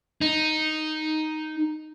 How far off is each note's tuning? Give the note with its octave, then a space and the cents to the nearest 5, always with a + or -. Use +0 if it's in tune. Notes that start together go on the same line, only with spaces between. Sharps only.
D#4 +0